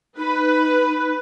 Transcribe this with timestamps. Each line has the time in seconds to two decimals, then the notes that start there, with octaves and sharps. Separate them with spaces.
0.18 D#4 B4